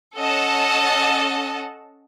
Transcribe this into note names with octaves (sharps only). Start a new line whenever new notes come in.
C#4 A4 D#5 F#5 A5